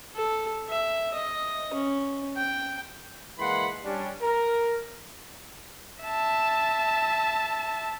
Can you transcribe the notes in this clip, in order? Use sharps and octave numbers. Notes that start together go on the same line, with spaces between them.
A4
E5
D#5
C#4
G5
E3 G#3 A#3 F#5 B5 C6
G3 C#4 D4
A#4
E5 A5